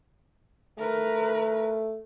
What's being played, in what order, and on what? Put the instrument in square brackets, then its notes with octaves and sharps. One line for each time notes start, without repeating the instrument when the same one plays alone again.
[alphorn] A3 [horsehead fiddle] A#4 B4